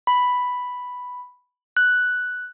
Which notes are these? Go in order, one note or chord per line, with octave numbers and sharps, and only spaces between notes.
B5
F#6